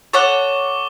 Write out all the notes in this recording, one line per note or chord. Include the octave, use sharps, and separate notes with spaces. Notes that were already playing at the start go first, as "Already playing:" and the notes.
A4 C#5 F#5 C#6 D6 G7